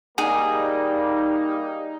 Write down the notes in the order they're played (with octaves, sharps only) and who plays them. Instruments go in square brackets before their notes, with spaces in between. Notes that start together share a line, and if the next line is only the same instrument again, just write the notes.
[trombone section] G3 A#3 [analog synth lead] D#4 [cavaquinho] G#4